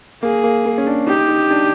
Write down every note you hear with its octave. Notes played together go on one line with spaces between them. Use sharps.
A#3 G#4
A#3
A#3
C#4
D4
D#4 G4
D#4
D4